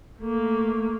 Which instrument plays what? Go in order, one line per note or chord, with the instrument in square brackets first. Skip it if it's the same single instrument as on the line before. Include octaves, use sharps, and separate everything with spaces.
[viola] A3 A#3